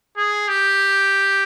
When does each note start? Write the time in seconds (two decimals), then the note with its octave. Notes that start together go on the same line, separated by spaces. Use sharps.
0.17 G#4
0.48 G4